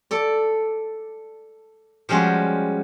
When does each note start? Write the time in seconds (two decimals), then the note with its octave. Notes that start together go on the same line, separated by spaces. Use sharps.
0.11 A4 D5
2.09 F3 G3 G#3 C#4 F4 F#4